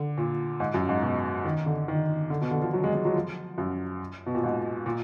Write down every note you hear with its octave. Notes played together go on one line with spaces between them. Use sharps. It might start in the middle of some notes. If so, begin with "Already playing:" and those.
Already playing: D3
A#2
G#2
F#2
G#2
B2
D#3
D3
D#3
D3
B2
D3
F3
F#3
G#3
G#3
F#3
F3
F#2
B2
A#2
G#2
A#2